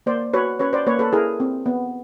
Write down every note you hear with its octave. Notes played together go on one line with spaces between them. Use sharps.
A#3 C5 D5
F#4 B4 C#5
C#4 B4 C#5
C5 D5
A#3 B4 C#5
A4 B4
E4 G#4 A#4
C4
B3